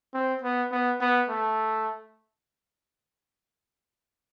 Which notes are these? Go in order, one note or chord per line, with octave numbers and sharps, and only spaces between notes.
C4
B3
B3
B3
A3